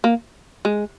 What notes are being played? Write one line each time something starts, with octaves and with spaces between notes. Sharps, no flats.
A#3
G#3